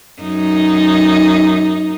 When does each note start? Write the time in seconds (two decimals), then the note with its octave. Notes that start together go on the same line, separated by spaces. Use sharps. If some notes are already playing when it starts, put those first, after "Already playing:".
0.22 F#2 D#4